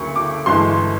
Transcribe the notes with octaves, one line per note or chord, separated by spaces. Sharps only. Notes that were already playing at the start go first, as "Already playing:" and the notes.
Already playing: D2 C#3 F#3 A#3 C#6
D6
G1 G2 E3 G#3 C6